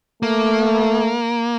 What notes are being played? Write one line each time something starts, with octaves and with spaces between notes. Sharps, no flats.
A3 A#3